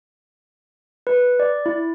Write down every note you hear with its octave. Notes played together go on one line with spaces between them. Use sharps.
B4
D5
E4